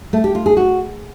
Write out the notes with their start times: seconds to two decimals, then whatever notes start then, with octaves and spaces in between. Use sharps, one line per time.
0.13 A3
0.24 G4
0.35 F4
0.46 G#4
0.57 F#4